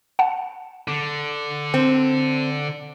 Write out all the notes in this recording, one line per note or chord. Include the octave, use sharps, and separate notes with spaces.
F#5 A5
D3
C4